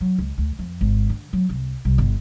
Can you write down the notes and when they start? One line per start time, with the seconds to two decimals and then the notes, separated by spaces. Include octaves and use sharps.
0.01 F#3
0.18 C#2
0.38 D2
0.59 F2
0.81 G#1
1.09 D3
1.33 F#3
1.49 C2
1.85 C2
1.98 G1